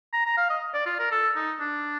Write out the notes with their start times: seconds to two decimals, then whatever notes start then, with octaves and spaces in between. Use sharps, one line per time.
0.13 A#5
0.26 A#5
0.37 F5
0.50 D#5
0.74 D5
0.86 F4
0.99 A#4
1.11 A4
1.35 D#4
1.60 D4